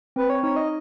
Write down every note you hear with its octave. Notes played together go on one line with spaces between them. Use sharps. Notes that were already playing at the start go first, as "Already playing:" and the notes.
C4 B4
C#5
D#4 C#5
D#5